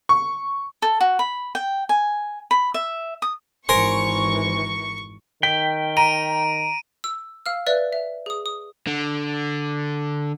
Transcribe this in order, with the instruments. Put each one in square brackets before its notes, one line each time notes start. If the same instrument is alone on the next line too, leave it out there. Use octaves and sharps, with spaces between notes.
[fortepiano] C#6
[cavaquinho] A4
F#4
B5
G5
G#5
B5
E5
D#6
[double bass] G#1 E3 [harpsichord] A#4 [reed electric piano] C5 G#5 C6 [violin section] C#6
[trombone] D#3 [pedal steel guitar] G5 [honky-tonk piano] B6
[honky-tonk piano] A#5 [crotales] D7 D#7
[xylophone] E6
F5 E6 F6
B4 D5 E5 F#6
E5
G#4 D#6
D#6
[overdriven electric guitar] D3